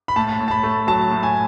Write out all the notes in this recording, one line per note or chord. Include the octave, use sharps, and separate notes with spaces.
B5
A2 A5
A2
A5
B5
A3
F#3 A5
A2
G#5